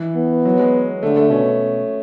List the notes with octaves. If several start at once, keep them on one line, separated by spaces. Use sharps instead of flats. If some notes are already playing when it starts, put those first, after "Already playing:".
Already playing: E3
B3
F#3
G#3
D3 A3
A3
B2 C#4